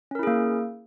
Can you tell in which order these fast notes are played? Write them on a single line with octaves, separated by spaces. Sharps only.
C#4 A#4 E4 G#4 A#3